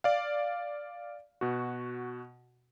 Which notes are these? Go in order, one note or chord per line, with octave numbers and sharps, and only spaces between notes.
D5 F5
B2 F#4